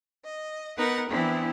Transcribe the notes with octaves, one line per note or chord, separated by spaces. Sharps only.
D#5
B3 D#4 A#4 B4 F#5
E3 B3 C4 D4 E4